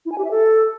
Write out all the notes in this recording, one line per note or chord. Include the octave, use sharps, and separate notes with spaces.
E4
G#5
G4
E5
A4